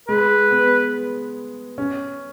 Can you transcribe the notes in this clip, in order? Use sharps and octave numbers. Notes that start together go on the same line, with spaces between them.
G#3 B4
B3
C#4